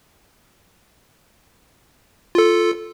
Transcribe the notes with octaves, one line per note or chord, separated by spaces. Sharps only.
F4 A4